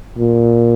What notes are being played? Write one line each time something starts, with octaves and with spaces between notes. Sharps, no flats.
A#2